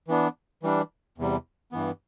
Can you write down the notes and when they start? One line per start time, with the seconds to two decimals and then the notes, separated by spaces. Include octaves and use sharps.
0.08 E3 B3 D4
0.63 E3 G3 D4
1.18 E2 C3 G3
1.72 G2 E3 B3